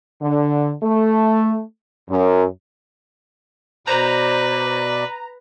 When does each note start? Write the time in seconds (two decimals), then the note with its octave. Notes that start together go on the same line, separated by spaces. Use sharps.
0.22 D3
0.83 A3
2.09 F#2
3.87 B2 B4 C5 D5 A#5